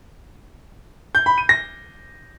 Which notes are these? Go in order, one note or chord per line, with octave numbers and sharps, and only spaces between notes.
G6
B5
D#7
A#6